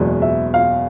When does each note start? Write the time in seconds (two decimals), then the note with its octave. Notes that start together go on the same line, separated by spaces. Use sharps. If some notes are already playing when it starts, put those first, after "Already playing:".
Already playing: F#1 E2 B2 G#3
0.22 E5
0.54 F5